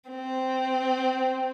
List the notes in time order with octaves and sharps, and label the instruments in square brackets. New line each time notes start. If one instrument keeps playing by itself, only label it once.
[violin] C4